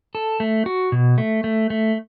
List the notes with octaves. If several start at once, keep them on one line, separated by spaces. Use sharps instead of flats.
A4
A3
F#4
B2
A3
A3
A3